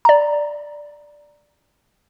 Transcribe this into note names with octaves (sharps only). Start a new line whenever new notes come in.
D5 A#5